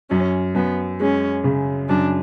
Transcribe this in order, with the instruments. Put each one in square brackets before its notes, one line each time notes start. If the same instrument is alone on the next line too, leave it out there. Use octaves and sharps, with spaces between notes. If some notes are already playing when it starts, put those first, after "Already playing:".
[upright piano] F#2 [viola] C#4
[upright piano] F#2 [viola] B3
[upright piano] G#3 [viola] C#4
[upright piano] C#3
[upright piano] F#2 [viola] D4